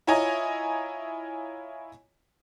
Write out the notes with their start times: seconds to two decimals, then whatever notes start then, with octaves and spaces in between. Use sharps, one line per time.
0.07 E4 F4 C#5 D#5 G#5 A#5